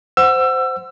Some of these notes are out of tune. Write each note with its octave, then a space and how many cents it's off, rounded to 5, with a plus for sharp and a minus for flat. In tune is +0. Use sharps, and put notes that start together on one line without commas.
C5 -10 F#5 +0 E6 +25